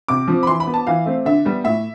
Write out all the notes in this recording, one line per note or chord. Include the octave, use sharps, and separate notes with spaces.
C3 D6
F3 C4
B5
E3 C6
B5
B3
A5
E3 F5
A3 C4
D3 E5
G3 B3
A2 E5